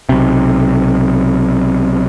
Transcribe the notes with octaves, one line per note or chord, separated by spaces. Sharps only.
B1 C3